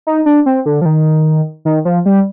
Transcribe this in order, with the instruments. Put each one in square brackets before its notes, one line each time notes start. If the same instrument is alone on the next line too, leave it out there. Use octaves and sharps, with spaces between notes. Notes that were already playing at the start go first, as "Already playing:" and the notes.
[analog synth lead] D#4
D4
C4
D3
F3
D#3
D#3
F3
G3